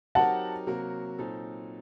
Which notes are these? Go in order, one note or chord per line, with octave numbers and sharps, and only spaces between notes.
F#3 C4 D#4 G4 A#4 F#5 A5
C3 F#3 A#3 F#4 A#4
A#2 F#3 C4 D#4 A4